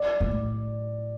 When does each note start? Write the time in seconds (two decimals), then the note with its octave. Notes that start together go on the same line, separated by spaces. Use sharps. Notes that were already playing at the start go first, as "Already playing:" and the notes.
Already playing: D5
0.20 A2